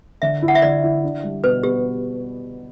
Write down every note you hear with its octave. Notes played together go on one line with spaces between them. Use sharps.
D3 E5
E4
F#5
E5
D3 D5
E4
D4
G3
B2 B4
B3 G4